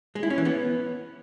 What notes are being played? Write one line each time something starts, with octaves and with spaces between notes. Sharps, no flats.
G#3
E4
C#4
E3
B3